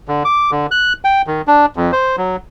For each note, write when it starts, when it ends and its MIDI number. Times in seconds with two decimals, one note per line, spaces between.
0.08 0.23 50
0.25 0.51 86
0.51 0.66 50
0.71 0.93 90
1.05 1.22 79
1.27 1.42 51
1.48 1.66 62
1.76 1.91 41
1.92 2.16 72
2.17 2.36 54